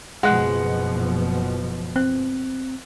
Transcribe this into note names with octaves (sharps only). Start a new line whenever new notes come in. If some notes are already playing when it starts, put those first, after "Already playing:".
F#1 B2 F3 G#3 F#5 F#6
C4 F#6